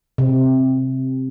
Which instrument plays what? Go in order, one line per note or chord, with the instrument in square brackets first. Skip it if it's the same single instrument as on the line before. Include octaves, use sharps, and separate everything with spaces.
[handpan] C3